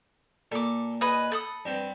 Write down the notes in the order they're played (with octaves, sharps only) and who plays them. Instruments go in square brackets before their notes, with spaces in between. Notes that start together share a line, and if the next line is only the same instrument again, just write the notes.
[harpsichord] A#2 [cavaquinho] A4 D6
[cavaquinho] G#4 B4 D#5
A4 B5 D#6
[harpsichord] G2 B3 C4